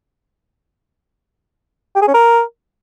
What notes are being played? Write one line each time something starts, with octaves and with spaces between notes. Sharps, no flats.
G4
G#4
C#4
A#4